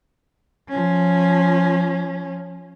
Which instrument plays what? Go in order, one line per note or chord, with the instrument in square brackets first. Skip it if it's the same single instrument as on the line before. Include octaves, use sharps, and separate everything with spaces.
[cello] F3 C#4